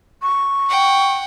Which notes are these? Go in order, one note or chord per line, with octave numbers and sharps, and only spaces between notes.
C#6
F#5 G5